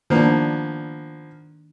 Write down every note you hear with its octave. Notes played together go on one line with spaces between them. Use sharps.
D#3 F3 A#3 B3 D4